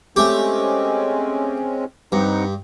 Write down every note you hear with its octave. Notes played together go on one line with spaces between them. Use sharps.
G#3 A3 C4 C#4 G4
G2 C4 D#4 F#5